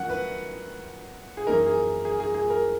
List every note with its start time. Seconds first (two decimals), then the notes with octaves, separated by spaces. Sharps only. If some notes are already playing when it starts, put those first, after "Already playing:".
Already playing: D#3 F#3 C#4 F#5
0.10 B4
1.37 G#4
1.47 F#2 E3 A#3 D#4 A#4
1.66 G#4
2.05 G#4
2.20 G#4
2.35 G#4
2.50 A#4